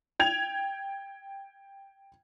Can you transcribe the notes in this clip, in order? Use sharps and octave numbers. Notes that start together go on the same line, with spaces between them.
G5 G#6 F7